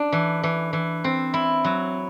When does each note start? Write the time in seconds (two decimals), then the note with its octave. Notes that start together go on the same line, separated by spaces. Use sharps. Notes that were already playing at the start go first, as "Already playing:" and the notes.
Already playing: D4
0.12 E3
0.43 E3
0.73 E3
1.04 C4
1.34 E4
1.64 F#3